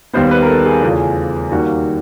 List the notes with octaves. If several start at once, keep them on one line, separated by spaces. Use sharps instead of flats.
D#2 D#3 G3 B3 C5
B4
A#4
A4
G#4
E2 C#3 F3 A3
D#2 D#3 G3 A#3 F#4